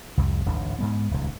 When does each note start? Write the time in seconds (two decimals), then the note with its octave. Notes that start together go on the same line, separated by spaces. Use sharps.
0.17 C2 F2
0.46 D1 A1 G#2 D4
0.79 G#2 G#3 B3
1.11 D#1 C#2 G#2 G#3